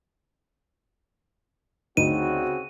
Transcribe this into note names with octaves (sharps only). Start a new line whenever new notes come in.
D2 C#3 C4 D#4 F#4 D#7